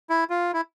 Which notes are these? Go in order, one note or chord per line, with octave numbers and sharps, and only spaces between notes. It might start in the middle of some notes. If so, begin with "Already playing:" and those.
E4
F4
E4